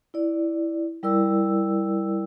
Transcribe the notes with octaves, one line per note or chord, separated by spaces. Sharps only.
E4 D5
G3 E4 A#4 D5 E6